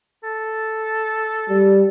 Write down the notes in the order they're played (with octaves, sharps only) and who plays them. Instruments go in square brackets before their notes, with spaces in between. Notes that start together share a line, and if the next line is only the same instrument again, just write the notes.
[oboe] A4
[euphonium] G3